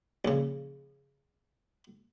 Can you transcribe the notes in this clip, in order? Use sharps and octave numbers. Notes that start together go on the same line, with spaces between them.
A#1 C#3